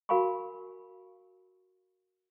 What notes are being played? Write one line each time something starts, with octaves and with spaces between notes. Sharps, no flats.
F#4 A#4 F5 G#5 B5 C#6